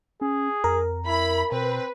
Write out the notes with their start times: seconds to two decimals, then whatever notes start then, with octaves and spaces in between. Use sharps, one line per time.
0.21 C#4 G#4
0.64 F2 A#4
1.07 E4 B5
1.52 B2 C4 B4